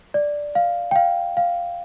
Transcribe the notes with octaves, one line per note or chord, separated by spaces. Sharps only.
D5
F5
G5
F5
F5